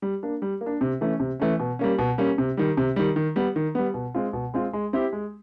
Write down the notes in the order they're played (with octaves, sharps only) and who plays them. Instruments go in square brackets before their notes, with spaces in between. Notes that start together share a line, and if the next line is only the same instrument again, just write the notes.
[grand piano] G3
A#3 D4
G3
A#3
D4
C3
E3 A3 C#4
C3
E3 A3 C#4
B2
G3 A#3 C#4
B2
G3 A#3 C#4
C3
D#3 G3
C3
D#3 G3
D#3
G3 B3
D#3
G3 B3
B2
G#3 C4 F4
B2
G#3 C4 F4
G#3
C4 E4 G4
G#3